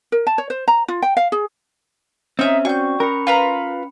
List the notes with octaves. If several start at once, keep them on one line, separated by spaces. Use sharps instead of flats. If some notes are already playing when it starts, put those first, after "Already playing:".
A#4
A5
C#5
C5
A#5
F4
G5
F5
G#4
C4 C#4 D#4 E5
F#4 D5 G5 C#6 G6
C#4 A#4 B5 C#7
F4 B4 A#5